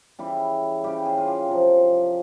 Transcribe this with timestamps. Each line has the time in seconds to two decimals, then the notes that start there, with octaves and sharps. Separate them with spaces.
0.19 C#3 E3 G3 E4
0.84 C#3 G3 G4
1.05 G#4
1.18 F4
1.27 G4
1.49 C3 F3